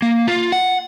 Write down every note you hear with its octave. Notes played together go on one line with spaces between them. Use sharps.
A#3
F4
F#5